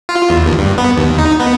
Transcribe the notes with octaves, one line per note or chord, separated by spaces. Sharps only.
F4
E2
D#2
G2
B3
D#2
D#4
B3